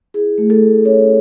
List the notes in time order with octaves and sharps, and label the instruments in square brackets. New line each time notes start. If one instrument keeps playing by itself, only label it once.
[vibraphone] E4 G#4
A3
A4
A3
C#4 C#5